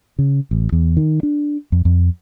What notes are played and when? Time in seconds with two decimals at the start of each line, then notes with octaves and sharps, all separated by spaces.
0.19 C#3
0.51 A1
0.72 E2
0.97 D#3
1.23 D4
1.72 F2
1.85 F2